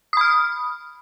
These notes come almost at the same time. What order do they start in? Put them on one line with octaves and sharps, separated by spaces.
D#6 B5 F6